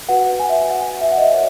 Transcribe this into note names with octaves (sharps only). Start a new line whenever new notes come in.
F#4 B4 F#5
G#5
E5
G#5
F#5
G#5
E5
F#5
D#5
E5
A#4 C#5